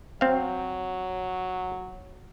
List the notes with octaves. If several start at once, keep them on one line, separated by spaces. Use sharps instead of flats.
F#3 C4 F5